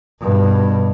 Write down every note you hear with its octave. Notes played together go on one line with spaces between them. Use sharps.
G2 B2